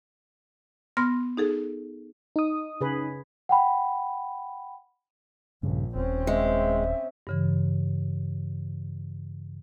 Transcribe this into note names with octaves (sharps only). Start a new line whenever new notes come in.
B3 C6 F6 A#6
D#4 G#4 A4
D#4 D#6
C#3 G#4 B4
F#5 G5 B5
A#1 G2 C#3
D#1 C4 C#4
G#3 E5
G2 C#3 E3